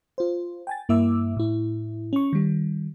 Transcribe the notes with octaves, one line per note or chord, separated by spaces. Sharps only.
F4 C5
G5 G#5 A6
G2 A#3 E4 E5 D6 E6
A2 E4
C#4 C#6
D#3 G3